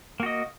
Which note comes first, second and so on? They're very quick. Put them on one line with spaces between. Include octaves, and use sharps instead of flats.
A#3 F#4 D#5